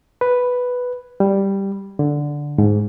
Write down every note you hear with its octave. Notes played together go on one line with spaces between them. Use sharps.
B4
G3
D3
G#2